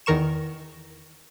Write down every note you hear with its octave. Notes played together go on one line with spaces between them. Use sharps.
E2 D#3 A#4 C#6 E7